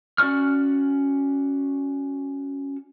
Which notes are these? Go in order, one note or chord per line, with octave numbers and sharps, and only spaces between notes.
C#4 F#4 D5 C#6 F6